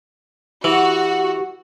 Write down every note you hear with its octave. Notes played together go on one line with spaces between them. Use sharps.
E3 F#4 G4